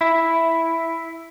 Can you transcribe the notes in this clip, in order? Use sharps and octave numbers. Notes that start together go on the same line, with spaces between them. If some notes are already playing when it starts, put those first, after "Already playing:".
E4